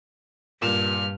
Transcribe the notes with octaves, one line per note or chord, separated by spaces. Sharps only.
G2 A#2 F6 E7